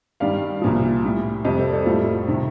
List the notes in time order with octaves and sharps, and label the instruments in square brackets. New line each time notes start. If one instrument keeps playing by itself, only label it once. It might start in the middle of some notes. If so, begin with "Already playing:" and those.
[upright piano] G2 D#3 G3 D5 F5
C2 A#2 F3
A2 G3
F2 C3 G3 C5 D#5
A4 C5
D5
A4 C5
A2 G3 F4 A4
C3 D#3